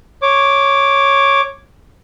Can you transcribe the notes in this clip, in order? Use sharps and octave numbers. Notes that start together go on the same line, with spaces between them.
C#5 D6